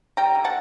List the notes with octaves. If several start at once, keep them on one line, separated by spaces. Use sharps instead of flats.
G3 G5 A#5
D3
F#5 A5